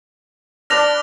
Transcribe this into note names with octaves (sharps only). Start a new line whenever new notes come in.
D4 B4 D5 F6 A#6 F7